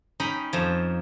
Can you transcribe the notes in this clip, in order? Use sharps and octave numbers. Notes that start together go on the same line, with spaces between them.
C#4 D#4 G5 A#5 B5
F2 F3 A#5